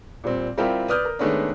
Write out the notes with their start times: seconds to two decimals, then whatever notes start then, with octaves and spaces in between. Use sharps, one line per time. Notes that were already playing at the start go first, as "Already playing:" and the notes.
0.24 A#2 G3 C4
0.57 G3 C4 E4 F4 G4 A#4
0.88 B4 D5 D#6 F6 G6
1.05 A#4
1.19 D#3 G#3 A3 B3 C#4 D4